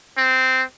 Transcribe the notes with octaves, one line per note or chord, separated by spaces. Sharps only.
C4